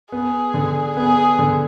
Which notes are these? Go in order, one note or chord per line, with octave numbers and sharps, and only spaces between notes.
B3 G#4
D3
B3 G#4
D3